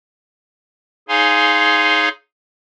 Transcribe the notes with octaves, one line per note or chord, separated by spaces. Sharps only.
D#4 G#4 C#5 F5 G#5 C6